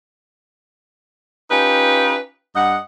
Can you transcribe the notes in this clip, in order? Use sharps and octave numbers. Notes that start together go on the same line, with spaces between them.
C#4 D#4 F4 G4 B4
G2 D#5 F#5